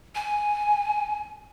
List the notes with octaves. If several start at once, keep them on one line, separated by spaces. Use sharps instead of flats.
G#5